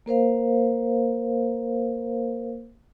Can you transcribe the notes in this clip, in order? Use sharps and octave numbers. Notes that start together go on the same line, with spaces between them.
A#3 A#4 C5 F5